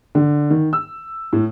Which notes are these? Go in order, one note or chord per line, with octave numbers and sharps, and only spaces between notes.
D3
D#3
E6
A2